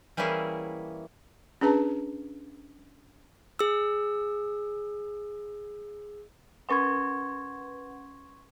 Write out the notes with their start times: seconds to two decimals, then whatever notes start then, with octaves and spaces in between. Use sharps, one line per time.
0.17 E3 G3 A#3 C#4 E4 G#4
1.61 C#4 D4 G#4 B4 A5 A#5
3.59 G#4 E6
6.69 C#4 B4 F#5 C6 C#6 G#6